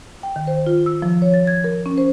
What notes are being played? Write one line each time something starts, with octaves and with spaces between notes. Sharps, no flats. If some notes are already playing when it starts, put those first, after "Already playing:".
G5
D#3
C5
F4
E6
F3
C#5
A6
G#6
A#4
C#4
C5